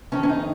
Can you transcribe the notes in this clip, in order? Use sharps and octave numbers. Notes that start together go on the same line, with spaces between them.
F2 D#3 C#4
C#4
D#4